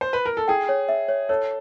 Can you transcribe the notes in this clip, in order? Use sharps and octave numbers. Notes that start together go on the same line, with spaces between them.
C5
B4
A#4
A4
G#4 G5
C#5
E5
C#5
A4 C#5